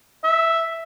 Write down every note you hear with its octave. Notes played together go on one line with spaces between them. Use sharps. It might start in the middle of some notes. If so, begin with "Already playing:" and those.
E5